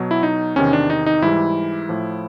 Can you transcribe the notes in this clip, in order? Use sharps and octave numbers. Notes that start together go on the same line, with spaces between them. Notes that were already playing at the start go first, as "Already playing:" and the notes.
Already playing: B2 F#3
E4
D#4
E2 C3 D#3 C#4
D4
D#4
D#4
G#2 E3 G3 E4
A2 F3